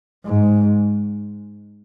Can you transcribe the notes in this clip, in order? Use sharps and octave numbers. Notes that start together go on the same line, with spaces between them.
G#2